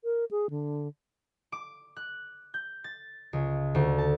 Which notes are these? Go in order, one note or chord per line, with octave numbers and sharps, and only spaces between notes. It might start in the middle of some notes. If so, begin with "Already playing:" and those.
A#4
G#4
D3
D6
F#6
G6
A6
C#2
D2
A5